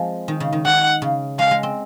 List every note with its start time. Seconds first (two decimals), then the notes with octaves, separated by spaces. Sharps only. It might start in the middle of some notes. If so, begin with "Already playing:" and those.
Already playing: F3 G#3 C4
0.28 D#3
0.40 C#3
0.53 D#3
0.65 D#3 F#5
1.02 C#3
1.39 G#3 F5
1.51 G#3
1.63 C4